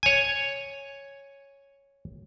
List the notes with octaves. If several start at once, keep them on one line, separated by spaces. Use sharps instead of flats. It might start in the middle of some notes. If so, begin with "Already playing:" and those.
C#5 G#5